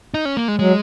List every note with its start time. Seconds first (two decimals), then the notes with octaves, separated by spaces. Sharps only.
0.14 D#4
0.25 C#4
0.37 A#3
0.48 G#3
0.59 F#3 G#3